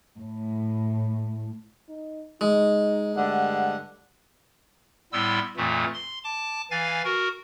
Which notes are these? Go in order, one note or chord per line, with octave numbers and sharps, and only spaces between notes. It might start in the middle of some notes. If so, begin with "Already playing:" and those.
A2
D#4
G#3 D#4
G2 D3 A3 F#5
A2 G3 B3 E4 C6 E6
F2 A#2 E3 A3
C6
A5 D6
E3 F5 G#5 A6
F#4 A#4